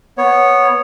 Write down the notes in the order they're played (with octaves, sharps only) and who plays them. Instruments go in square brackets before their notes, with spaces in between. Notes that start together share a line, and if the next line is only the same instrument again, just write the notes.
[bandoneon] B3 C#5